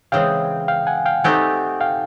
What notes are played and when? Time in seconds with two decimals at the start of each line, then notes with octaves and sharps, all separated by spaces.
0.12 C#3 E3 G#3 C4 F5 G5
0.68 F5 G5
0.87 F#5 G#5
1.06 F5 G5
1.24 A3 C4 D#4 G4 F#5 G#5
1.81 F5 G5